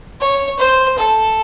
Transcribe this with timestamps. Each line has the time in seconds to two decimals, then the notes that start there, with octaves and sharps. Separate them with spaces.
0.21 C#5
0.60 C5
0.98 A4